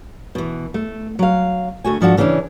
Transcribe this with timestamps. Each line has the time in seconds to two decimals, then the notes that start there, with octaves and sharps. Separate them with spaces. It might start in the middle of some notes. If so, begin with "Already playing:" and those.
0.35 B2 E3
0.74 A3
1.19 F#3 F5
1.84 D2 A3 F#4 G#5
2.01 G#2 F3 D4 F#4 A4
2.17 C#3 E3 B3 C#4 D4